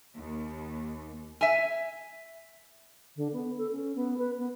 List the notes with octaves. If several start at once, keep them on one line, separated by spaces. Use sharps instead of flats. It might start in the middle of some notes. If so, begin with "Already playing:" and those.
D#2
E5 G#5
D3
B3
A4
C#4
B3
B4
B3